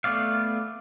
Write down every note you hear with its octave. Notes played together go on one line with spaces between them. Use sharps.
A3 B3 D5 F5